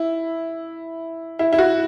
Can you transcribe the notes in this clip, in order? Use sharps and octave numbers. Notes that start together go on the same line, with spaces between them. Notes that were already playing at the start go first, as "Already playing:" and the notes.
Already playing: E4
E4
E4
F#4